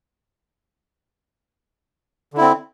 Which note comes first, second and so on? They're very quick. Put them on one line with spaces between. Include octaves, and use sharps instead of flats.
D3 E4 C4